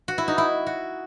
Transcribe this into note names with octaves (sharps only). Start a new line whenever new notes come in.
F#4
E4
D#4
E4
F#4